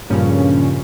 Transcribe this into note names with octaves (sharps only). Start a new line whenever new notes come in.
G2 A#2 C#3 F3 C#4